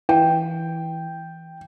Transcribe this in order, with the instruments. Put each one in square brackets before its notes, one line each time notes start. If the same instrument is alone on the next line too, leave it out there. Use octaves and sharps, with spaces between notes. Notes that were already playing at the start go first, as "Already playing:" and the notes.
[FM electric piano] E3 [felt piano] G5